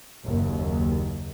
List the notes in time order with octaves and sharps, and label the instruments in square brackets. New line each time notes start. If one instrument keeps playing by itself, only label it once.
[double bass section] F#1 D#2